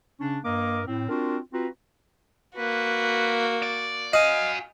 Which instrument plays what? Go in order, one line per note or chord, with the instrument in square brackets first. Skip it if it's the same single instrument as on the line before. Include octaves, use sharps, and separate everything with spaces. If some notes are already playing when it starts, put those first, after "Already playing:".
[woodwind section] C#3 C#4 D4
G2 A#3 A#4 D#5 D6
A2 C4
C4 D4 F4 F#4 A#4
C4 F4 F#4 B4 A#5
[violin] A#3 F#4 [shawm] B4
[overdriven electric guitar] D5
[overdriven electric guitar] F#4 G#5 [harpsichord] D#5 [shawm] F5